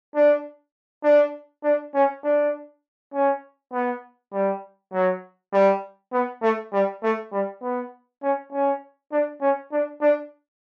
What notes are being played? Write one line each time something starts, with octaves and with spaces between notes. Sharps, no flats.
D4
D4
D4
C#4
D4
C#4
B3
G3
F#3
G3
B3
A3
G3
A3
G3
B3
C#4
C#4
D4
C#4
D4
D4